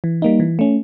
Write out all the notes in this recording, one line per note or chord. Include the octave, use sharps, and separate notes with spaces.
E3
G3 A#3 D#4
E3
A3 C#4